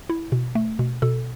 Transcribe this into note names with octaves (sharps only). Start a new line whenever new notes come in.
E4
B2
A3
B2
B2 A4